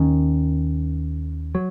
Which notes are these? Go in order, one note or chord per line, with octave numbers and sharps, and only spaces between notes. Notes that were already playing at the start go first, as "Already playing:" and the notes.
Already playing: D#2 D#3 C#4
F#3